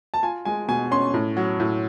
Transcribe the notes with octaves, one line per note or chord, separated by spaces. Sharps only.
A5
F4 G#5
G#3 G#5
B2 G#5
C#4 C6
A2
F#3
A2